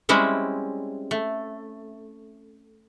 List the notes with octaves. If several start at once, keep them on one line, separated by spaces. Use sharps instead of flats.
G3 G#3 C4 C#4 E4
A3